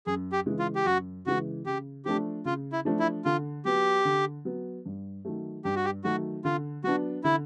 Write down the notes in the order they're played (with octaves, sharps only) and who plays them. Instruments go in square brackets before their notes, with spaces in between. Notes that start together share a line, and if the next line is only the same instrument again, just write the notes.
[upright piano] F#2 [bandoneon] G#4
[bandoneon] G4
[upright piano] C#3 E3 G#3
[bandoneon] F4
G4
[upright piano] F#2 [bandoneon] F#4
[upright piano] C#3 E3 G#3 [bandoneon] F#4
[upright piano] C#3 [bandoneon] G4
[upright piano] F3 A3 D4 [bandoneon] G4
[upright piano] C#3 [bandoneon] F4
[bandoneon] E4
[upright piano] F3 A3 D4
[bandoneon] E4
[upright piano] D3 [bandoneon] F4
[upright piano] F#3 B3 [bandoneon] G4
[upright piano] D3
F#3 B3
G2
D#3 F#3 A3
[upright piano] G2 [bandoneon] G4
[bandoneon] F#4
G4
[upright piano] D#3 F#3 A3 [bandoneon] F#4
[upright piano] D3 [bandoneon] F4
[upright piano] F#3 B3 D4 [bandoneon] F#4
[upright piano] D3 [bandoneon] E4